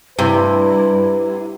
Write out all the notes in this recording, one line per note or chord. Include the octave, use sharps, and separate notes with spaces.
G2 C3 E4 B4